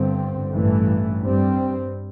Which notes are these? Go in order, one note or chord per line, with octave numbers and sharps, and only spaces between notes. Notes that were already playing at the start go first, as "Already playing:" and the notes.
Already playing: G1 G2 D3 C4
A1 G2 E3 A3
G2 G3 C4